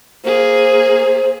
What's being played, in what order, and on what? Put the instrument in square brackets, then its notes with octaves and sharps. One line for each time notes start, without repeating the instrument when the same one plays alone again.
[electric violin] A#3 G#4 [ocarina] C5